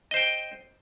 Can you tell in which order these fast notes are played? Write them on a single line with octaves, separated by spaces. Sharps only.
D#5 C5 G5